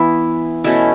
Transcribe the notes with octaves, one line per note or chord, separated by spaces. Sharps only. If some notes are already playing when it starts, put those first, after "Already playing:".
Already playing: E3 B3 E4
B2 A3 C#4 E4